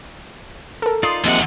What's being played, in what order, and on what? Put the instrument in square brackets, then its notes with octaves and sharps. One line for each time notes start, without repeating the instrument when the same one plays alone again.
[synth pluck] A4 A#4
[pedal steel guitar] D#4 F4 D5 [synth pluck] C6 D#6 C7
[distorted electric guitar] D#2 F#5 [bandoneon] C3 G#3 [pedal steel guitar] F3 A#3 C4